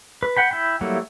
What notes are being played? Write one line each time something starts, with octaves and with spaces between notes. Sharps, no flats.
B4
F#5 G5 B5
E4 G5 B5
F#3 G3 A3 A#3 E4